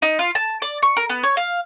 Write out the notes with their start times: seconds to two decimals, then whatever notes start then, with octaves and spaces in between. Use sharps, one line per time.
0.02 D#4
0.19 F4
0.35 A5
0.62 D5
0.82 C#6
0.97 A#4
1.09 B3
1.23 C#5
1.37 F5